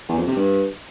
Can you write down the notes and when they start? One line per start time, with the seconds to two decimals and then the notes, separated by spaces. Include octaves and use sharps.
0.09 E2
0.18 F2
0.27 C3
0.36 G2